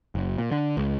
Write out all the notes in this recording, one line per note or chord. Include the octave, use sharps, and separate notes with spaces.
F#1
A#2
D3
C#2